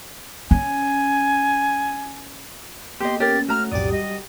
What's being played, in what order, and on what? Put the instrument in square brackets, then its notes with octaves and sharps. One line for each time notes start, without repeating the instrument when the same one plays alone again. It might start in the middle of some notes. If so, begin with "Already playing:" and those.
[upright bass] C#4 [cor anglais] G#5
[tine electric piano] A#3 B3 [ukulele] G4 D#5 [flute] C6
[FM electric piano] C#4 [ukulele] G4 A#4 [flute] A6
[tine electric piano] A3 [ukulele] F#4 A#5 [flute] F6
[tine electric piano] B1 F2 A2 [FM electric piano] G4 D#6 [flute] D5
[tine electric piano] G3 [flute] D#5